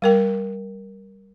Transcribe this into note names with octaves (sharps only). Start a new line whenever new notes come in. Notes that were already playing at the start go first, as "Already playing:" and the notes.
G3 A#4 G5